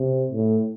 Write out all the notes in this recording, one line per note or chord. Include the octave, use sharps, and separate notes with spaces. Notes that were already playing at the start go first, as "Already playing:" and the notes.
Already playing: C3
A2